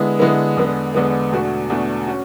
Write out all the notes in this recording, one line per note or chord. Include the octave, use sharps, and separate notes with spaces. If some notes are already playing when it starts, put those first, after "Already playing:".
Already playing: D3 G#3 B3 E4
D3 G#3 B3 E4
E2 D3 G#3 B3
E2 D3 G#3 B3
E2 B2 A3 D4 F#4
E2 B2 A3 D4 F#4
C#4 F#4